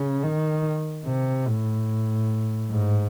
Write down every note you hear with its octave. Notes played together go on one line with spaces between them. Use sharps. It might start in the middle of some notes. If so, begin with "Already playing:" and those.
Already playing: C#3
D#3
C3
A2
G#2